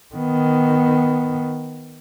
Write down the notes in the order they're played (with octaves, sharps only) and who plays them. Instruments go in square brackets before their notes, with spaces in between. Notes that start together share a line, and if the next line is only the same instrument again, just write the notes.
[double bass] D#3 B3